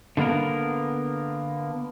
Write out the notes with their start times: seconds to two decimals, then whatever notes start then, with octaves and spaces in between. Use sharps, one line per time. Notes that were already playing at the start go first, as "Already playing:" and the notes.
0.17 D3 G3 A#3 B3 A#4